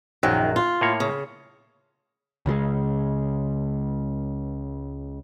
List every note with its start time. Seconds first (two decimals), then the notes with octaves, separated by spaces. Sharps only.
0.23 A#1 F#2 D#3 F#3
0.56 F4
0.81 A2 A#3 C#5
1.00 C#3
2.46 C#2 C#3 F3 G#3